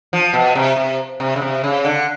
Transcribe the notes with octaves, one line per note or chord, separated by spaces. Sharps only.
F3
B2
C3
C3
C3
C#3
C3
C#3
D3